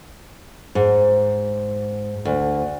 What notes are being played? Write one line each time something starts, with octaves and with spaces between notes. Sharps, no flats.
G#2
D2